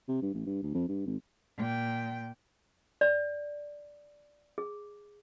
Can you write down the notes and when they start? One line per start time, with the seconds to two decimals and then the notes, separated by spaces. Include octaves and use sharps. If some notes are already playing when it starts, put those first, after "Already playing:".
0.08 C3
0.22 G2
0.34 A1
0.46 G2
0.63 D2
0.74 F2
0.88 G2
1.06 G#1
1.57 A#2 G5
3.01 D5
4.58 G#4